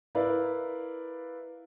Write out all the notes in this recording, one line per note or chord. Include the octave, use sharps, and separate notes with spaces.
E4 A#4 B4 D5 F5